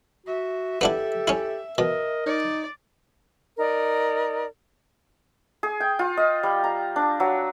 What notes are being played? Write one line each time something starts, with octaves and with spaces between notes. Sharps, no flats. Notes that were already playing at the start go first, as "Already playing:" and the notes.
F#4 E5
B3 D4 E4 G4 A4
C#4 E4
B2 A#4 D#5
D#4 D5
D#4 A#4 D5
G#4
G5
F4
D#5
G3
A#5
D4
F#3